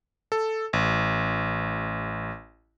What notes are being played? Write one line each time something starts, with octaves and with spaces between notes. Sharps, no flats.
A4
A1